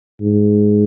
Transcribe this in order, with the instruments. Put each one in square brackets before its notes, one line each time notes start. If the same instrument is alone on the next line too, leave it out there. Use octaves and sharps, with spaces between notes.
[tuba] G#2